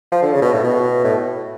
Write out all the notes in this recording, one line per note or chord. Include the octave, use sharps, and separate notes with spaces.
F3
D3
C#3
B2
A2
B2
A2